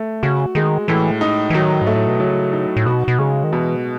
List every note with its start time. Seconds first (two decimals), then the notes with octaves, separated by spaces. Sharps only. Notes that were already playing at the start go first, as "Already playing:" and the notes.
Already playing: A3
0.23 C#3 F#4
0.55 D#3 G#3
0.88 A2 E3
1.21 D#4
1.50 E3
1.54 D#3 F#3
1.82 G#2
1.87 A3
1.94 A2
2.07 B2
2.20 C#3 F#3
2.53 D#4
2.77 A2
2.86 B2 F#4
3.08 B2
3.19 C#3 G#3
3.44 D#3
3.53 B2 E3